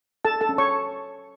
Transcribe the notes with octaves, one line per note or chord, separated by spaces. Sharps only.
G#4 A4 A5
A4 A5
C#4
C#5 C#6